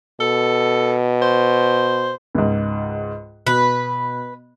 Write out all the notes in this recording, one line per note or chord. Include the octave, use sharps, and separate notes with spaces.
B2 A4
C5
C#2 G#2
B2 B4 B5